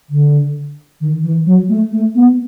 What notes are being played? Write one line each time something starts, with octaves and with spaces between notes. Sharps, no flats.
D3
D#3
E3
F#3
A3
A3
B3